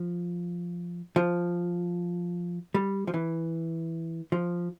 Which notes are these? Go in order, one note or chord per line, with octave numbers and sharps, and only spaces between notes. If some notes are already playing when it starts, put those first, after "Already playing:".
Already playing: F3
F3
G3
F3
E3
F3